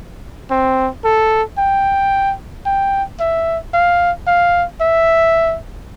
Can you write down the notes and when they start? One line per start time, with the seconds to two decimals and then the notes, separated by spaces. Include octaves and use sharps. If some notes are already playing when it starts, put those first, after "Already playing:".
0.51 C4
1.04 A4
1.58 G5
2.65 G5
3.20 E5
3.74 F5
4.27 F5
4.81 E5